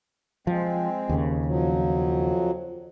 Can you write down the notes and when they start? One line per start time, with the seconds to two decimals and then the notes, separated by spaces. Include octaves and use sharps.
0.47 F3 G#3 C4
1.09 D#2 C#3
1.45 F2 F3 F#3